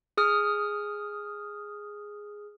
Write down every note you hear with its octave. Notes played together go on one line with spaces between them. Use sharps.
G#4 D#6 F6